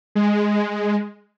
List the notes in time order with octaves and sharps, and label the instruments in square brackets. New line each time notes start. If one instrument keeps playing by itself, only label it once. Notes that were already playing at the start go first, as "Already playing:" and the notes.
[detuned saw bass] G#3